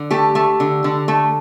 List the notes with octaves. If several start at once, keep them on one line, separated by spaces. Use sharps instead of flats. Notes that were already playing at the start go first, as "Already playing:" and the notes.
Already playing: D3
A3 G4
A3
D3
D3
A3